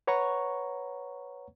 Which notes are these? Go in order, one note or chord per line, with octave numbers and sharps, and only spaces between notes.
B4 C#5 F#5 A#5 C#6